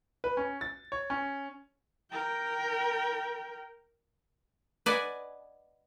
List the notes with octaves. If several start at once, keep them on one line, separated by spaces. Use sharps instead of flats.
B4
C#4
A6
C#5
C#4
A#4 G5
B4 D5 D#5 F#5 G#5